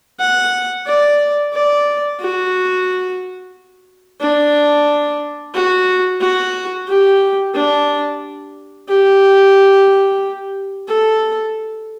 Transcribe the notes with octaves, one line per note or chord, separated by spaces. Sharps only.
F#5
D5
D5
F#4
D4
F#4
F#4
G4
D4
G4
A4